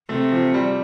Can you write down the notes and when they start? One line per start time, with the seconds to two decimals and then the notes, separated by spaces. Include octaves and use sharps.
0.09 C3 A3
0.32 F3
0.54 G3